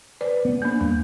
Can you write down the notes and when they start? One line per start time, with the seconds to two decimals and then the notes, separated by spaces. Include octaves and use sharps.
0.21 B4 C5 D5
0.45 B3
0.62 A#3 D4
0.81 E2 G3